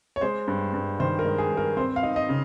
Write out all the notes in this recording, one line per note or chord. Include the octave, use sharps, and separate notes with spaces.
C#5
G#3 C5
G2
G2
D#3 C5
A#4
G#3
G#4
G2
A#4
C4 C5
F5
D#4
D#5
C#3